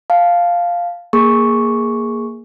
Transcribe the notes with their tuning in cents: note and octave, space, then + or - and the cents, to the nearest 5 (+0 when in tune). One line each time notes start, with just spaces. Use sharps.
F5 +0 A5 -15
A#3 +0 G#4 +0 C#6 +0